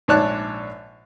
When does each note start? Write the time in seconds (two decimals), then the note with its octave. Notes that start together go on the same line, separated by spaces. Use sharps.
0.08 A#1 G#2 C#5 D5 A5 F#6